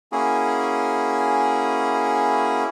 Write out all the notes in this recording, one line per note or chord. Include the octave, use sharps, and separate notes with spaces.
A#3 C#4 E4 F#4 G#4